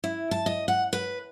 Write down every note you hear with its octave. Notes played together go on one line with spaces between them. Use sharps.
E4
A5
D#5
F#5
B4